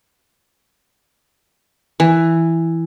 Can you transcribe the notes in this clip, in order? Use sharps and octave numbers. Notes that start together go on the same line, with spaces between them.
E3